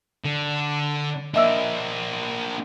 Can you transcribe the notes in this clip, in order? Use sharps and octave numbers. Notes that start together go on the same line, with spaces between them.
D3
A#3 D4 D#5 E5 E6